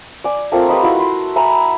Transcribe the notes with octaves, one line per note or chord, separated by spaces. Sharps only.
D5 G#5
A3 A#3 C4 F4
G4 B4 D#5 B5
E4 F#4
C6
E5 G#5 A#5 B5